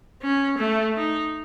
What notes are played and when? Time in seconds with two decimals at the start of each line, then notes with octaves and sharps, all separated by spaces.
0.22 C#4
0.58 A3
0.96 D#4